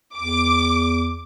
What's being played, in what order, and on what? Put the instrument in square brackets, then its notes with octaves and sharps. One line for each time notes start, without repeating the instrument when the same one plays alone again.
[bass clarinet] E2 [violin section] D6